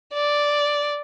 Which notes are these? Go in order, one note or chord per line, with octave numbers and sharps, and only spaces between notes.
D5